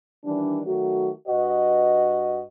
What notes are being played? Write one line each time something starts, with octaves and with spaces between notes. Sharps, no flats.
D#3 E3 G3 D4
D#3 F#3 A3 F#4
G2 F#4 B4 D#5